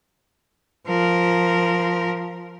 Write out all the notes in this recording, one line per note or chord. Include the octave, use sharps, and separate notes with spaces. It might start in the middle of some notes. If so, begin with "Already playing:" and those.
F3 A#4